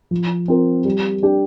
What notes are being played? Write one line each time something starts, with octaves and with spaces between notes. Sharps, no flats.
F3
C4 F4 A#4
G3
D4 G4